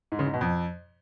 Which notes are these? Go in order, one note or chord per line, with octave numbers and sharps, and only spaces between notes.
G#2
C#3
G#2
B2
F2